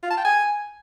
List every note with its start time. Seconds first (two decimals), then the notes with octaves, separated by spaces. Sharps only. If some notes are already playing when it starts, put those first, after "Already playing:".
0.03 F4
0.10 A5
0.18 G5
0.25 G#5